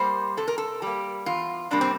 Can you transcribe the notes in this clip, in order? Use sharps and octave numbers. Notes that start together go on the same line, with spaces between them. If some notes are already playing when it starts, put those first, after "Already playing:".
Already playing: G3 A#3 C5
C3 A4
A#4
A4
G3 A#3 G4
E2 F4
C3 G3 A#3 D4
C4